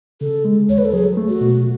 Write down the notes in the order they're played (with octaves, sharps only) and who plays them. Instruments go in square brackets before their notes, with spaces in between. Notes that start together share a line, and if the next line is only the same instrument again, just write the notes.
[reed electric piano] C#3 [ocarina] A4
[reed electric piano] G#3
[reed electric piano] D#2 [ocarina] C#5
[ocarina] B4
A4
[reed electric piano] F#3 [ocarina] G#4
[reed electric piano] A3
[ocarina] F#4
[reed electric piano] B2